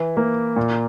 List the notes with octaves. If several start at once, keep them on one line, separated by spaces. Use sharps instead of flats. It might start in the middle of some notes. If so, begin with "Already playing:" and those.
Already playing: E3
A#3
A#2